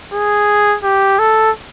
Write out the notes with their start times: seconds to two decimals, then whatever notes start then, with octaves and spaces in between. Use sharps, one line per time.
0.13 G#4
0.84 G4
1.19 A4